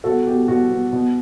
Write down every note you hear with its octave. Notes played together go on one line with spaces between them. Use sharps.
B2 F#4 A4
B2 G4
B2 F#4
B2
B2